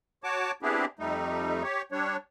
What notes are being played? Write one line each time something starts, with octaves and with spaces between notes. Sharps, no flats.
F#4 C#5 A5 D6
B3 C4 D4 E4 G4 G#4
F2 G3 A3 D#4
G4 C#5
G3 D4 C#5